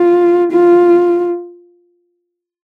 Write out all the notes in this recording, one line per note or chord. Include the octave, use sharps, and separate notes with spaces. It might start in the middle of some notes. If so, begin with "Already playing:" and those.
Already playing: F4
F4